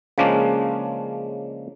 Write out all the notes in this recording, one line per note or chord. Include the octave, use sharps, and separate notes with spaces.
C#3 F3 G#3 A#3 C#4 D4